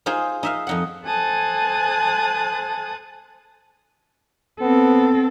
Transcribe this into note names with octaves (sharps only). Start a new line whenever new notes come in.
D#4 F4 G#4 C5
D#4 E5 F5
F2 D#4 F#5
A4 C5 G#5 A5 D#6 F#6
B3 C4 A4